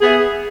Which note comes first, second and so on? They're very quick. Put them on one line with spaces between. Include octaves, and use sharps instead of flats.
G#4 B3 E5